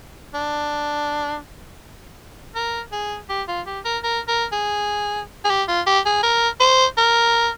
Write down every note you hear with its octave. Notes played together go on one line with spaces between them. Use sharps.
D4
A#4
G#4
G4
F4
G4
A#4
A#4
A#4
G#4
G#4
G4
F4
G4
G#4
A#4
C5
A#4